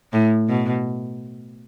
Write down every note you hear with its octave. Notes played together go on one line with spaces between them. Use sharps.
A2
B2